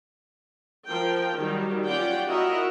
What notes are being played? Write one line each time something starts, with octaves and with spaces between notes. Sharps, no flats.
F3 A#4 G5
D#3 F#3 G3
C#4 F4 G4 D5 F#5 G5
E4 F#4 A#4 D#5 E5 F#5